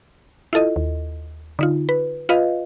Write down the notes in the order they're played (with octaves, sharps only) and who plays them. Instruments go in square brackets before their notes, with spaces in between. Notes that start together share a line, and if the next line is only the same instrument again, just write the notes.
[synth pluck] E4 F4 A4 D#5
D#2
D3 D#4 F4
B4
F4 B4 D#5 F5